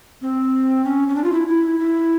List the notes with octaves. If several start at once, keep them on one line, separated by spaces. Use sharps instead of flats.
C4
C#4
C#4
D4
F4
E4
E4
E4